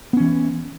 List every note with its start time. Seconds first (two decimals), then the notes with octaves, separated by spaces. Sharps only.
0.13 B3
0.17 C#4
0.20 E3